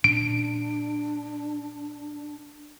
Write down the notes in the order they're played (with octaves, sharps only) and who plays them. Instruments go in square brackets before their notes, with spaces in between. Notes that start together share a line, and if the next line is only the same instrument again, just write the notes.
[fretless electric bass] A#2 C#4 [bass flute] D4 [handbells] D7